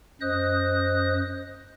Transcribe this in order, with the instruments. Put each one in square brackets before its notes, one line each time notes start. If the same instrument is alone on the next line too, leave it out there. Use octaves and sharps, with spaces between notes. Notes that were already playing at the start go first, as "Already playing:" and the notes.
[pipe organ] F#2 C5 D#5 D#6 F#6